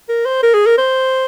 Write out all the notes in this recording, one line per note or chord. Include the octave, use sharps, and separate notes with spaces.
A#4
C5
A#4
G#4
A#4
C5